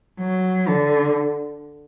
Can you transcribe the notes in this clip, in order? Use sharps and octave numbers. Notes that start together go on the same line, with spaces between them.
F#3
D3